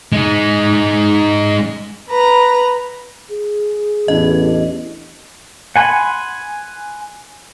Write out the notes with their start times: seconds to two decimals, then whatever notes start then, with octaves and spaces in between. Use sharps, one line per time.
0.12 G#3 D#4
2.09 B4 A#5 B5
3.30 G#4
4.08 A1 E2 D4 E4 G4 D#5
5.76 F#5 G#5 B5 C6